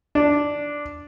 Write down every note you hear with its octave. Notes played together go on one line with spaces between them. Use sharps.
D4